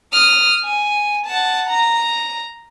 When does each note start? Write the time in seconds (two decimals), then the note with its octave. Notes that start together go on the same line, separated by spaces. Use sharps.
0.13 D#6 F6
0.64 G#5
1.26 F#5 A5
1.69 A#5